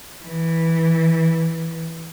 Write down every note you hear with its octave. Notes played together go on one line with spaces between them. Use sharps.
E3